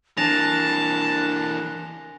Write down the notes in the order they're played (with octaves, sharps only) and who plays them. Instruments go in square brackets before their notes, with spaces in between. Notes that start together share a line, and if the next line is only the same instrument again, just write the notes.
[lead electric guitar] E3 A#3 [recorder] D4 [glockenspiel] G#5 A#6 F7 [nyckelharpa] A5